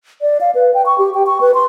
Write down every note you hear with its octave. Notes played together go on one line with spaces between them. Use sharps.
D5
F5
B4
G5
C#6
G4
G5
C#6
B4
C6